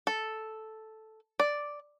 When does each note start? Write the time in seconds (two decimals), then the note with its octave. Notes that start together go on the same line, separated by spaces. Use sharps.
0.07 A4
1.40 D5